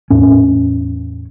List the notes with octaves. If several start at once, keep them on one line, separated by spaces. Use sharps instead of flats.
E2 A2 C#4